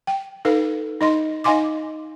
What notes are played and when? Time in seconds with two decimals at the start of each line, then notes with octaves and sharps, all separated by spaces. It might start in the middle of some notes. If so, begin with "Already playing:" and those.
0.07 G5
0.45 D#4 A4 B4 F5
1.01 D#4 D#5 C6
1.44 D#4 D#5 F5 G#5 C6 D6